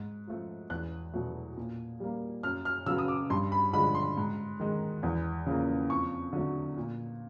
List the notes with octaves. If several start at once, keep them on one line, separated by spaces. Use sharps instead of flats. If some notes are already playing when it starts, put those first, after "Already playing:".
Already playing: G#2
F3 A3
E2 F#6
B2 F#3 A3
A#2
G3 A#3
F#2 F6
F6
C#3 F#3 B3 E6
D#6
D6
G2 C6
B5
D3 F3 G#3 B5
C6
G#2
D#3 G#3
E2
C#3 F3 A#3
F2 C#6
D3 F#3 A3
A#2